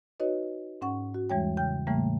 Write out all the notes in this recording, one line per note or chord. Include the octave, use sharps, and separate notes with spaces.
D#4 F#4 B4 C#5 D#5
G#2 C#4 F#5 C#6
F#4
E2 E3 G3 G#3 C#5 G5
C#3 G5 G6
A2 C#3 E3 G3 A3 A#3